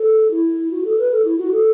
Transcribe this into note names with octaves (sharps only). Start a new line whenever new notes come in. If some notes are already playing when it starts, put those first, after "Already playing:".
Already playing: A4
E4
F#4
A4
B4
A4
E4
F#4
A4